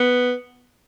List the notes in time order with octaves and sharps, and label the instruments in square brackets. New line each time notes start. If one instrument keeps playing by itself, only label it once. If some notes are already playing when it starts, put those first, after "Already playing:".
Already playing: [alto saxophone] B3